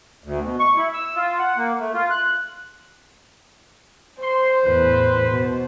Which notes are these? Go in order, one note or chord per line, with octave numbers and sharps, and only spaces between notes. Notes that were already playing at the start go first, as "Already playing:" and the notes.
D2
B2
C#6
E4
E6
F4
F#5
A#3
A3
F4
F#6
C5 C6
E2 A2 B4
B2